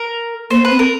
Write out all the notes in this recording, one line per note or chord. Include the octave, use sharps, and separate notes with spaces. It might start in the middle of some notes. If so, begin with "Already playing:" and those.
Already playing: A#4
A#3 C5
B4
C4
A#4